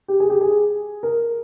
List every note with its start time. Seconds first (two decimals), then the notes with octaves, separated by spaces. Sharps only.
0.08 G4
0.20 G#4
0.30 G4
0.41 G#4
1.03 A#4